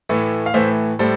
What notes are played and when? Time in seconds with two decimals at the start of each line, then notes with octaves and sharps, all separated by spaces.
0.09 A2 E3 A3
0.46 F5
0.54 A2 E3 A3 C5 E5
0.99 A2 G3 A4 C5